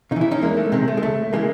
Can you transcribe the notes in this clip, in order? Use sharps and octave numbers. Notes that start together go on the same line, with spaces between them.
C#3 D#4
E3 E4
C#4 D#4
E2 G#3 A#3
A3
C3 D#3 G#3
A3
G#3
C#2 A3
C#3 E3 G#3 A#3